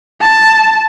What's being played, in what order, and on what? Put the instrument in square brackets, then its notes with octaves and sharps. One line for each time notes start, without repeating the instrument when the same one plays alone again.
[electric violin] A5